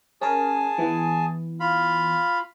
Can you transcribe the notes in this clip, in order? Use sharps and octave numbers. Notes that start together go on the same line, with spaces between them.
C#4 G#4 A#4 G#5 A5
E3 B3
F4 F5 B5